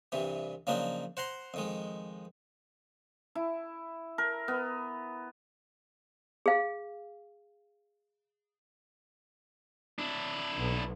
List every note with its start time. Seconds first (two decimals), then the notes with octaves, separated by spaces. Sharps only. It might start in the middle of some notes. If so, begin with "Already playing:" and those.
0.12 C2 G2 C3 E3
0.67 C#3 F3 F#3 A#3 D4 D#4
1.17 C5 F#5 A#5 C6
1.54 F2 D#3 G#3
3.35 E4
4.18 A#4
4.48 B3
6.46 G#4 F5
9.99 D4 E4
10.59 B1